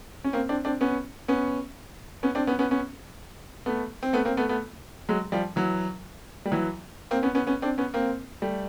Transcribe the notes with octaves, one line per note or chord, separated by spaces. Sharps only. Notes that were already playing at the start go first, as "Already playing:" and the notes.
C#4
A#3 C4
C4 D4
C4 D4
B3 C#4
B3 C#4
B3 C#4
C4 D4
B3 C#4
B3 C#4
B3 C#4
A3 B3
C4
A3 B3
A#3 C4
A3 B3
A3 B3
F#3 G#3
F3 G3
E3 F#3
G3
E3 F#3
A#3 C4
B3 C#4
B3 C#4
B3 C#4
C4 D4
B3 C#4
A#3 C4
G3 A3